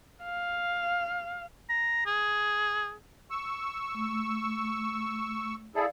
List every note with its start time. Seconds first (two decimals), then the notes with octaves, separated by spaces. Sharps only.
0.25 F5
1.69 A#5
2.06 G#4
3.30 C#6 E6
3.95 A3
5.75 E4 G#4 A4 D5 F5